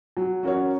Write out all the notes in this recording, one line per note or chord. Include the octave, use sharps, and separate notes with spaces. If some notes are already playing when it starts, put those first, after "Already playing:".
F#3
C#4 F#4 A#4 C#5